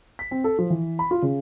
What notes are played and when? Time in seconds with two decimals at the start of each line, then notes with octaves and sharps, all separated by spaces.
0.19 B6
0.31 C4
0.44 A4
0.59 F3
0.70 E3
0.99 B5
1.11 F4
1.22 C#3